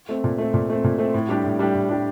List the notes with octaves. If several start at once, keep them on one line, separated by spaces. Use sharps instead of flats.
A3 C4
A#2
A3 C4
A#2
A3 C4
A#2
A3 C4
A2
G3 D4 G4
A2
G3 D4 G4
A2
G3 D4 G4